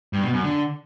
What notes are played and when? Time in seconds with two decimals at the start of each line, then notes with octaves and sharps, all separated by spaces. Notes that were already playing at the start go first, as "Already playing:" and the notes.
0.13 G2
0.23 B2
0.33 F#2
0.43 D3